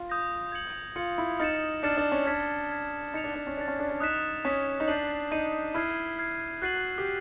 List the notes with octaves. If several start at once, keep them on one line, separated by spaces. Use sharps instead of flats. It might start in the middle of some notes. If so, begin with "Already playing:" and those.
Already playing: F4
D#6 G6 A#6
G#6 C#7 F#7
F4 G#6 C#7 F#7
E4
D#4 F6 A6 C#7 E7
D4 F6 A6 C#7 E7
D4
C#4
D4 F6 G#6 B6
F6 G#6 B6
D#4 A6 C#7 F7
D4
D4
C#4
D4 A6 C#7 F7
C#4
D4
D4
D#4 D#6 F#6 B6 E7
C#4 D#6 F#6 B6 E7
D#4
D4 G6 C7 D#7 F#7
D#4 G6 C7 D#7 F#7
E4 F6 G#6 C7
F6 G#6 C7
F#4 F#6 A6 C7 D#7 F#7
G4
C7